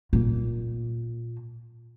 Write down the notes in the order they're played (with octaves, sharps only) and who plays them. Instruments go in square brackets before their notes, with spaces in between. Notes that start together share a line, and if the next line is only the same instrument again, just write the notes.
[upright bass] A#2 A#3